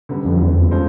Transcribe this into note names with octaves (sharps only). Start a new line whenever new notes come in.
F#2 D3 G3 B3
F2
E2
F2
G#3 C#4 F4 A4 C5